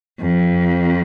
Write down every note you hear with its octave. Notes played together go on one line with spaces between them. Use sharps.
F2